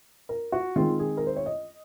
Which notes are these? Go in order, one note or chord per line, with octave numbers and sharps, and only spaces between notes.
A#4
F#4
D#3 G#3 C4 F4
G#4
A#4
C5
C#5
D#5